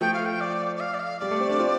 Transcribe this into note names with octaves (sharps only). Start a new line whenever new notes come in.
F3 A3 G5
F5
G5
D5
D5
F5
D5
F5
G3 D5
A3
C4
D4
C4 F4